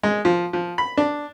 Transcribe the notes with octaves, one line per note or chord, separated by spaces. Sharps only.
G#3
F3
F3
B5
D4